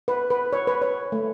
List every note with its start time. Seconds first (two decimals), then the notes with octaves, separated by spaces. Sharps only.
0.08 B4
0.30 B4
0.53 C#5
0.67 B4
0.82 C#5
1.12 A3